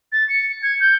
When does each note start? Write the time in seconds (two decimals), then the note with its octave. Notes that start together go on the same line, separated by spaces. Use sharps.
0.12 A6
0.29 C#7
0.63 G#6
0.80 G6